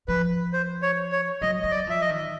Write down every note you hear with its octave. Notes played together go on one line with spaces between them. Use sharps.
F3 B4
C5
C#5
C#5
F#3 D#5
F#3 D#5
D5
F3 E5
D#5
D#3